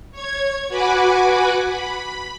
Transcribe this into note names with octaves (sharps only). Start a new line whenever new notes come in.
C#5 G#6
F#4 B4 F#5 G#5 B5 D6
B5